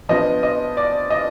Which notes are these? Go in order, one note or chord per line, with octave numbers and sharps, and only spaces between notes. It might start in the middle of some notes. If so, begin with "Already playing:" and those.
F3 B3 D4 D#5
D#5
D5
D#5